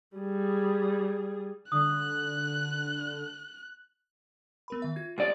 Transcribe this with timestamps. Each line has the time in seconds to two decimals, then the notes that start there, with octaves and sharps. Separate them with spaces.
0.17 G3 G#4
1.72 D3 D#6 F#6
4.68 B3 A#4 B5
4.82 D#3 E5
4.96 F4 G#6
5.18 C2 C5 D5 D#5